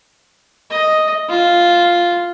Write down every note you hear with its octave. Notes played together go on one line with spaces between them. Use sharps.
D#5
F4